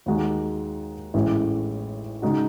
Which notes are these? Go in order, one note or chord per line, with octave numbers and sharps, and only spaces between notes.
D#2 D#3 G#3 D#4 F#4
A1 A2 G#3 C#4 E4
C#3 G#3 D#4 F#4